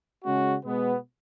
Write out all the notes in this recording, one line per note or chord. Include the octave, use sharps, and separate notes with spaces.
C#3 G#3 C#4 F#4
B2 G#3 B3